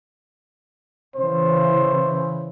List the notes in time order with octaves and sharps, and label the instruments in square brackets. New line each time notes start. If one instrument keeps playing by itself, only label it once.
[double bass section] C#3 E3 [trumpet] C5